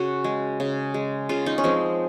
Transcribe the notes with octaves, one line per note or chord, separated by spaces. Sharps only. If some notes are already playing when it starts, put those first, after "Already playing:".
Already playing: C#3 F#4
G#3
C#3
G#3
C#3 F4
D#4
C#4
F3 G#3 C4